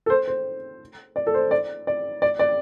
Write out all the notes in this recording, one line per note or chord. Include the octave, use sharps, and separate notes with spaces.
A4
C5
C5
D5
A4
C5
D5
D5
D5
D5